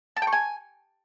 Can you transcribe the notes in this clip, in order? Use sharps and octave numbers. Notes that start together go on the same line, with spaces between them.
A5
G5
C#6
G#5